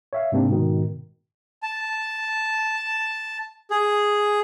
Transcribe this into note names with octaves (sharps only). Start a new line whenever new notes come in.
C#5 E5 F5
G#2 C3 A#3 C4 D4
G#2 B2 D#3
A5
G#4